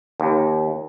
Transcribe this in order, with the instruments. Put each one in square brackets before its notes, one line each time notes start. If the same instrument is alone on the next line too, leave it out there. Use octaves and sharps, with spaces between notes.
[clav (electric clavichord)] D#2